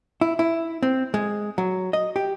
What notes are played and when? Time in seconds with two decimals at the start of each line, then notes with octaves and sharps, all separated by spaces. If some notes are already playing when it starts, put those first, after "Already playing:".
0.21 E4
0.39 E4
0.83 C4
1.14 G#3
1.58 F#3
1.93 D#5
2.16 G4